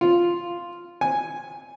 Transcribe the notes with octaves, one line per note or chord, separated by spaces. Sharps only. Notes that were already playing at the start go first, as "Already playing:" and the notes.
F4
G#5